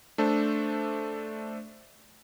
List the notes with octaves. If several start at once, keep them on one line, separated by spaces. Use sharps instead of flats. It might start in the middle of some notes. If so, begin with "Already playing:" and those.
A3 D4 A4 C5